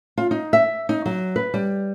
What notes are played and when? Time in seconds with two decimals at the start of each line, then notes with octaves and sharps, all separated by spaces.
0.18 F4
0.31 D#4
0.53 E5
0.89 D#4
1.06 F#3
1.36 B4
1.54 G3